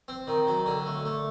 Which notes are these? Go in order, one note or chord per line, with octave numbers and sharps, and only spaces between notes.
C4
D#3
F#3
D3
A3
A3